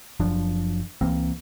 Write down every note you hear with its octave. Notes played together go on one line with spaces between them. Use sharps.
F#1 F#2 F3 D4
C#2 E3 A#3 C4